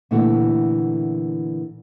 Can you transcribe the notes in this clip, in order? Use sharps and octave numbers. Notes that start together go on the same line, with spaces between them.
A#2 D3 E3 A3 E4 F#4